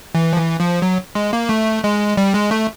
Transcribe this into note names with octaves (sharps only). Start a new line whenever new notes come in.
E3
F3
E3
F3
F#3
G#3
A#3
A3
G#3
G3
G#3
A3